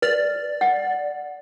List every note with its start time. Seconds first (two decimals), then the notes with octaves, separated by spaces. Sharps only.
0.02 B4 D5
0.61 F#5